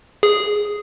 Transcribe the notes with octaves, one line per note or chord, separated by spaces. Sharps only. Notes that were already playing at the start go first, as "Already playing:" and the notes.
G#4